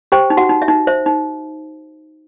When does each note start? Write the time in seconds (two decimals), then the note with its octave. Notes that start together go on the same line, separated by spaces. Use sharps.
0.12 G4 C5 G5
0.30 D#4
0.37 F#4 F#5
0.49 D#4
0.62 E5
0.68 D#4
0.87 C5 E5
1.06 D#4